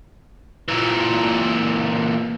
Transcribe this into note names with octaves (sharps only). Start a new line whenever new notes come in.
A#2 E3